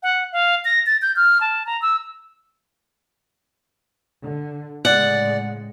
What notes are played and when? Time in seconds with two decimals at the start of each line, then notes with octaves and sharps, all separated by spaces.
0.03 F#5
0.33 F5
0.65 A#6
0.86 A6
1.02 G6
1.16 F6
1.41 A5
1.66 A#5
1.82 E6
4.23 D3
4.85 A2 C#3 G#3 D5 F#5